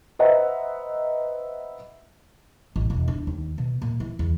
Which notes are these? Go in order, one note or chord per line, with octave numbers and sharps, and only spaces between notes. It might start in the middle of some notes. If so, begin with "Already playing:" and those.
B4 C5 D#5 E5 F#5 A#5
A1
E1
D4
D#2
B2
A#2
E3
E2